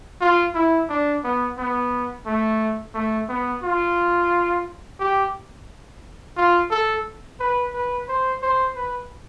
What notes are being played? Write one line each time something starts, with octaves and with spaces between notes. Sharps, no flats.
F4
E4
D4
B3
B3
A3
A3
B3
F4
G4
F4
A4
B4
B4
C5
C5
B4